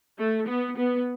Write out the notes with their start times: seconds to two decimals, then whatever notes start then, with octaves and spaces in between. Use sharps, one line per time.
0.18 A3
0.47 B3
0.77 B3